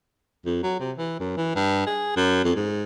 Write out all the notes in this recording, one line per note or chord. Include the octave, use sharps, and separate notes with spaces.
F2
F#3
C3
E3
F#2
E3
G2
G#4
F#2
F2
G#2